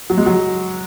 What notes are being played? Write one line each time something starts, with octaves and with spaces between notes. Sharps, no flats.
F#3
G#3
F#3